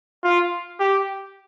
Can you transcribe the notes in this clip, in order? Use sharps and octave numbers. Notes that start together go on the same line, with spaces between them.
F4
G4